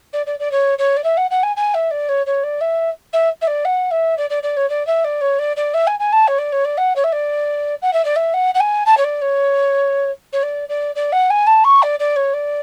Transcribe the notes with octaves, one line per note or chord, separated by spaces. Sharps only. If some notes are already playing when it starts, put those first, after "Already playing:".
D5
D5
D5
C#5
C#5
D5
E5
F#5
F#5
G#5
G#5
E5
D5
C#5
C#5
D5
E5
E5
E5
D5
F#5
E5
D5
D5
D5
C#5
D5
E5
D5
C#5
D5
D5
E5
G#5
G#5
A5
C#5
D5
C#5
D5
F#5
C#5
E5
D5
F#5
E5
D5
E5
F#5
F#5
G#5
A5
C#5
D5
C#5
C#5
D5
D5
D5
F#5
G#5
A5
C#6
D5
D5
C#5
D5